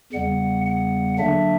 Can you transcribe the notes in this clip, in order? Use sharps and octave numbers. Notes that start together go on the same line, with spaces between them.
E2 C#3 G3 B3 F#5
F#5
D3 F#3 A#3 D4 E5